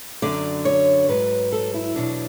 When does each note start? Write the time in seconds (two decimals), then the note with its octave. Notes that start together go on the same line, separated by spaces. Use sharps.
0.22 F#2 D3 F#3 D5
0.65 C#5
1.09 G#2 F#3 B4
1.52 A4
1.74 E4
1.96 E2 B2 F#3 D4